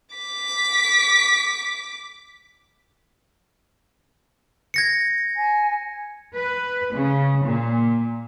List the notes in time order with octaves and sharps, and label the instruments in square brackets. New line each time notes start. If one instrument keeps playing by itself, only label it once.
[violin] D6 B6
[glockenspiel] G#6 A#6 C#7
[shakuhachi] G#5
[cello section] B4
C#3
A#2